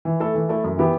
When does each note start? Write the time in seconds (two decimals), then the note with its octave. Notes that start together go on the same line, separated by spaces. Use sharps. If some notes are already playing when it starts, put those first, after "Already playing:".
0.05 E3
0.20 A3 E4 A4
0.35 E3
0.49 A3 E4 A4
0.64 F#2
0.78 E3 B3 E4 G4